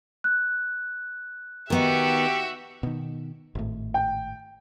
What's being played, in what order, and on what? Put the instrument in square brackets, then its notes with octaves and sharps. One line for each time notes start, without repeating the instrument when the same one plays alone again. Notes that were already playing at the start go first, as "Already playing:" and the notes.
[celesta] F#6
[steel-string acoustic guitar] D#3 B3 D#4 [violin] F#4 E5 [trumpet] G4
[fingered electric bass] B2 D#3
G#1 A2
[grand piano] G5